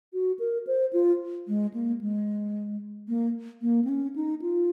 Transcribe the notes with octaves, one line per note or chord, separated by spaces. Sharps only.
F#4
A#4
C5
F4
G#3
A#3
G#3
A#3
A#3
C4
C#4
D#4
F4